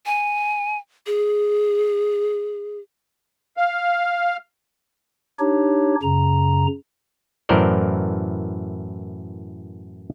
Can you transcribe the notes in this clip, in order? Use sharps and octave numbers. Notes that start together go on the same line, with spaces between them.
G#5
G#4
F5
D4 D#4 G4 C#5
F#2 C#3 A#5
F#2 A2 E3 A#4 C5 D5